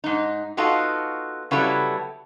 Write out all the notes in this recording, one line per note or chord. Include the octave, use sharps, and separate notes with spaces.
G#2 D#4
B3 D#4 F4 F#4 A4
C#3 F#3 G3 B3 E4 A4